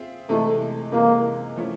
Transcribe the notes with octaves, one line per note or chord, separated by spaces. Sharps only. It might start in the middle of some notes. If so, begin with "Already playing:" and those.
Already playing: C4 F4 G#4 E5
C3 E3 G#3 A3
C3 E3 G#3 A#3
F3 A3 C#4 E4